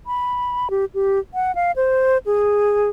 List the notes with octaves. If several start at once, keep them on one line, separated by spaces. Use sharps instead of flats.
B5
G4
G4
F#5
F5
C5
G#4